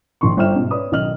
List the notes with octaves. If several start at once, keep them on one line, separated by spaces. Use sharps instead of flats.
A#1 D#3 C6 C#6
G1 C5 E5 G5 F6 E7
G#2 B2
B4 C#5 D5 B5 D#6
B1 D#3 D#5 F6 F#7